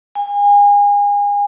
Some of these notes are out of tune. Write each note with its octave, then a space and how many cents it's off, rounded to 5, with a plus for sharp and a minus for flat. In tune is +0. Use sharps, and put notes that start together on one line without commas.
G#5 -30